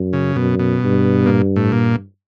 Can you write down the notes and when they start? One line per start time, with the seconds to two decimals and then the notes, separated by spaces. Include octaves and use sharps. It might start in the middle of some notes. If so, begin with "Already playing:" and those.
Already playing: F#2
0.13 C#3
0.36 F#2 B2
0.59 B2
0.82 G2
1.26 A#2
1.56 A2
1.72 A#2